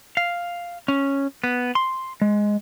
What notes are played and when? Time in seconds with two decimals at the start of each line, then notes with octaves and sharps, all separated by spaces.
0.17 F5
0.88 C#4
1.44 B3
1.75 C6
2.22 G#3